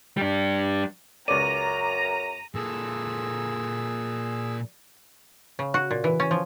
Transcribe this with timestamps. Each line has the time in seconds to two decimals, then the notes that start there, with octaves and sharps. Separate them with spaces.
0.17 G3 D4
1.28 C#2 F#2 D5 A#5 D#7
2.55 A#2 G#4 A4 E6
5.59 C#3
5.74 F#4
5.91 A#2
6.04 E3
6.20 C#4
6.31 F3